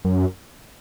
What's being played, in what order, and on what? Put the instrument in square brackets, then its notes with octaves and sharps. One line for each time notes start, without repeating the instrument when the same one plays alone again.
[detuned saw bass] F#2